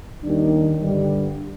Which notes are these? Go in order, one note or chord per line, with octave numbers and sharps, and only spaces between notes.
D#2 D#3 G3 D4
G2 D3 G3